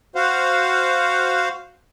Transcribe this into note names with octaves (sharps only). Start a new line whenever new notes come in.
F#4 C5 F5 F#5